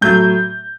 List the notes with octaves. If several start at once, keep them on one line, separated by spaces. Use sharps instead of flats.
A2 F#3 A3 G6